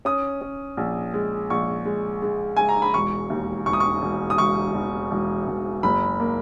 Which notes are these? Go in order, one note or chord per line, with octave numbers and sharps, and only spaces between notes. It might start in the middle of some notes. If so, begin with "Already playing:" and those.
C#4 D#6
C#4
A#1
G#3
A#1 C#6
G#3
G#3
G#3 G#5
A#5
B5
E1 C#6
D#2
E1 C#6
D#6
C#6
E1
D#6
E1 C#6
E1
E1
E1
F#1 B5
A#3